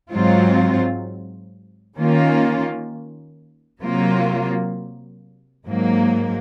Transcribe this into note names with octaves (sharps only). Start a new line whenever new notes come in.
G#2 F#3 C4 F4
D#3 A#3 C#4 F4
C3 F#3 A#3 F4
G#2 F#3 A#3